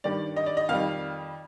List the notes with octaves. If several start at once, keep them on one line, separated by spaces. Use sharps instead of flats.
G2 D#3 G3 D5
D#5
D5
D#5
F2 D#3 G3 F5